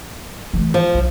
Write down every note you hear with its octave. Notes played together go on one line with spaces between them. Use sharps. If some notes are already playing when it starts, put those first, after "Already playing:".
E3 A3
F3
B1